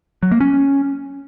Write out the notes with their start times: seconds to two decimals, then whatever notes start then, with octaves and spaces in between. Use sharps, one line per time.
0.23 F#3
0.32 A#3
0.41 C#4